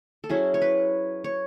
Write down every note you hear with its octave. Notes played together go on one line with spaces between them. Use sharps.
A4
F#3 C#4 E4 G#4
C#5
B4
C#5